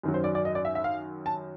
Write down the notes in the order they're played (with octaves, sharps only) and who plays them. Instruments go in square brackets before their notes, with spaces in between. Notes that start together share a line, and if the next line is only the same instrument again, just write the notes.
[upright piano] F#2 D#3 F#3
C5
D5
D5
D#5
D5
E5
E5
F5
A5